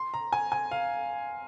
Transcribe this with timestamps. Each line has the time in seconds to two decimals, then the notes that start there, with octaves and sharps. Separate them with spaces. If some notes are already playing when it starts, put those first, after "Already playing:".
Already playing: C6
0.14 A#5
0.32 G#5
0.52 G#5
0.71 F5